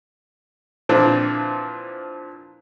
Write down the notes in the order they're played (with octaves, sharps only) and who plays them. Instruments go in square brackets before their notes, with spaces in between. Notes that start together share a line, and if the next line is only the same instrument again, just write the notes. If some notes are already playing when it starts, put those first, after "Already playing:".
[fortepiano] A#2 E3 F3 C4 D4